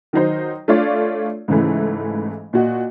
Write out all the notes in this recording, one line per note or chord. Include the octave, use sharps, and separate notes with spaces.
D#3 F#3 D#4 C5
A3 D4 F4 C#5 D5 F5
G#2 C#3 E3 A3
A#2 F#4 D#5